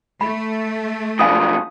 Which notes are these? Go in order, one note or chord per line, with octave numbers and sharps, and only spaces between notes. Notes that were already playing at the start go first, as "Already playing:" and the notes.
A3 B5
B1 F3 F4 F5 G#5 D#6